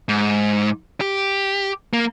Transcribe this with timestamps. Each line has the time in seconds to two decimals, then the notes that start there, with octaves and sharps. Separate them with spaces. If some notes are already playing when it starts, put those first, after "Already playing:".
0.09 G#2
1.01 G4
1.93 A#3